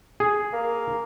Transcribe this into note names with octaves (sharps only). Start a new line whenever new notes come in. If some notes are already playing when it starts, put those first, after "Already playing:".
G#4
A#3